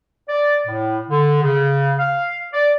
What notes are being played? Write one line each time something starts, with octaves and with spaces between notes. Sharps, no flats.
D5
A2
D3
C#3
F5
D5